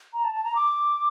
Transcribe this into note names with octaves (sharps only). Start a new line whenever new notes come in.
A#5
A5
A5
A#5
D6